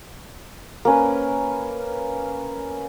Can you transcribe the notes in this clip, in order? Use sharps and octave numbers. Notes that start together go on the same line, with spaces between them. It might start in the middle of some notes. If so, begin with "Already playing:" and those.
A#3 C#4 B4